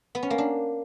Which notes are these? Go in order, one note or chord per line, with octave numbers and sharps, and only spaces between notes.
B3
C#4
A#3
D4